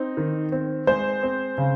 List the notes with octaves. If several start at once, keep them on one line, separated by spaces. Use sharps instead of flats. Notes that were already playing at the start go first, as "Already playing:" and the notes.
Already playing: C4 D#4
D#3
C4
G#3 C5
C4
C#3